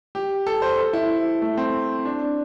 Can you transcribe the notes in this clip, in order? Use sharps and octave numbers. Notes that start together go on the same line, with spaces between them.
G4
A4
C5
A4
E4
A3
C4
D4